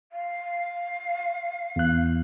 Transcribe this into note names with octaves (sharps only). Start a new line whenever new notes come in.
F5
E2 F#6